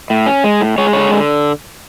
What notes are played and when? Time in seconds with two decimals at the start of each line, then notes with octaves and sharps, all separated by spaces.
0.10 A2
0.26 C#4
0.44 G#3
0.61 A2
0.78 G#3 C#5
0.93 D3 C#5
1.12 D3